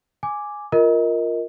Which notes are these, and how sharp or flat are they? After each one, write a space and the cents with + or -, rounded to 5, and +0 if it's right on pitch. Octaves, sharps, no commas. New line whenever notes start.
G#5 +0 D6 +0
F4 +0 A#4 +0 D#5 +20